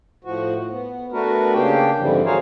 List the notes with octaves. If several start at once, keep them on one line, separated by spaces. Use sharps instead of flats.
A2 F3 F#4
B3
A3 B3 D4 F#4 A#4 B4
C#3 A#3 D4 G4 G5
F2 G#2 D3 E3 F3 G3
F#4 G#4 A#4 C5 C#5 F5